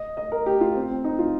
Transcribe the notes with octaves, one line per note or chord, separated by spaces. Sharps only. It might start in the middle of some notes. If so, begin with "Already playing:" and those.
Already playing: D#5
D#5
A#4
G4
F4
C4
C4
D#4
F4